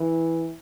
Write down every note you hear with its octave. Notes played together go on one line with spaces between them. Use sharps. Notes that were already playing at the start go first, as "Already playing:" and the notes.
Already playing: E3